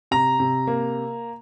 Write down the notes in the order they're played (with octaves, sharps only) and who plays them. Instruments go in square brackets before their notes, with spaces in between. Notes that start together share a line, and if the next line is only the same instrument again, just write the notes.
[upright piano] C3 [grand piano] A#5
[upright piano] C3
A#3